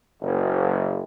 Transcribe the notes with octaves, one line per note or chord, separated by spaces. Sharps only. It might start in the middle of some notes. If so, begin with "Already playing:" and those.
F#1